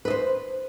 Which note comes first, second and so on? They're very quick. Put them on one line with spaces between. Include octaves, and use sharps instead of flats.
B4 D#5 C5